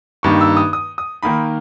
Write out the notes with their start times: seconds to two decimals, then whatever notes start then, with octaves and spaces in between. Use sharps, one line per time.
0.23 G2 D#3 A#3 D#4 C#6
0.41 E6
0.57 D#6
0.73 D#6
0.98 D#6
1.23 D#3 A#3 D#4 B5